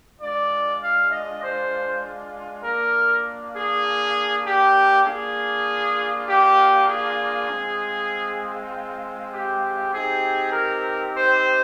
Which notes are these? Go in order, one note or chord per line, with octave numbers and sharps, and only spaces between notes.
G#3 D4 F4 D5
F5
D#5
C5
A#3 D4 F4 A#4
G#4
G4
A#3 D4 F4 G#4
G4
G#4
G#3 C4 F4
G4
C4 D#4 G4 G#4
A#4
C5